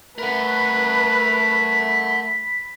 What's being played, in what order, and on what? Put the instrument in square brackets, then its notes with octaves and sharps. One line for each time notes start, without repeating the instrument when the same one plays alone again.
[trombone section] A3 [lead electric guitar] A#4 F#5 [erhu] B4 [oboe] B5